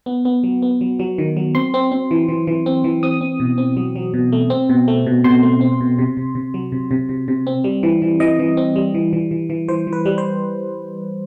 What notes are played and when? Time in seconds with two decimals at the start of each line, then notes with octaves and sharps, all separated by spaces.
0.06 B3
0.25 B3
0.43 F#3
0.62 B3
0.81 F#3
0.99 F#3
1.18 D#3
1.37 F#3
1.55 C4 C6
1.74 C4
1.92 C4
2.11 E3
2.28 E3
2.47 E3
2.66 C4
2.84 E3
3.03 C4 D#6
3.21 C4
3.40 B2
3.58 C4
3.77 F#3
3.96 F#3
4.14 B2
4.32 A3
4.50 C4
4.69 B2
4.88 A3
5.06 B2
5.24 B2 C6
5.43 A3
5.61 C4
5.81 B2
5.99 C3
6.17 C3
6.35 C3
6.54 F#3
6.72 C3
6.91 C3
7.09 C3
7.28 C3
7.47 C4
7.64 G3
7.83 E3
8.02 E3
8.20 E3 D#5
8.39 E3
8.57 C4
8.76 G3
8.94 E3
9.13 E3
9.31 E3
9.50 E3
9.68 E3 C5
9.87 E3
9.93 B4
10.05 G3
10.18 C5